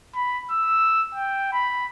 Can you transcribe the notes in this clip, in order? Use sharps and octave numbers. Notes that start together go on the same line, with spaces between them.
B5
E6
G5
B5